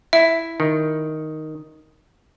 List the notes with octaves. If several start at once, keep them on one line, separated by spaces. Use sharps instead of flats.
E4 E5
D#3